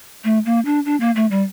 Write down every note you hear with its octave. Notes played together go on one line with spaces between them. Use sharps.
A3
A#3
D4
D4
A#3
A3
G3